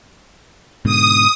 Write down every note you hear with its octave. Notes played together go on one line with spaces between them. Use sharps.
G#2 B2 D3 D#6